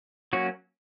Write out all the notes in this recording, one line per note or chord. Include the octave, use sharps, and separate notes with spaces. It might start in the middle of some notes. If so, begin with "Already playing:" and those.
F#3 A#3 C#4 F#4